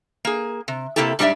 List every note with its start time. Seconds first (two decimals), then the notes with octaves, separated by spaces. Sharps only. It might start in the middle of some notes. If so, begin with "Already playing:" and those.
0.25 A#3 G#4
0.68 C3
0.96 C3 E3 A#3 E4 G4 A4
1.19 G#2 G3 D4 D#4 D5 E5